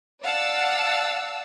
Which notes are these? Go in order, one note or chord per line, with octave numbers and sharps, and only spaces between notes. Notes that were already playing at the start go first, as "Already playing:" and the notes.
D5 F5 F#5 A5 E6